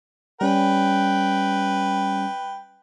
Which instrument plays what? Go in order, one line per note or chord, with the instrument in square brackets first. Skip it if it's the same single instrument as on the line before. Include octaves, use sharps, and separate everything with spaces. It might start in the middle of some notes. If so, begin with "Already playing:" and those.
[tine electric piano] G3 C#4 [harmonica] B4 G5